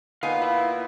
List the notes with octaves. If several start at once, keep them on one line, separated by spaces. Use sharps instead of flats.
A#2 B3 D#4 F5 G#5
E4 F5